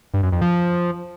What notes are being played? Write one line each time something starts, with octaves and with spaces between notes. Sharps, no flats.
G2
F#2
F2
F3